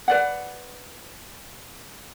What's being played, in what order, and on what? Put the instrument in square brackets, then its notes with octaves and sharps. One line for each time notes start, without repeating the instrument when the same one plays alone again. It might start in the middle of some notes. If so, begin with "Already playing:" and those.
[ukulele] B4 D5 F#5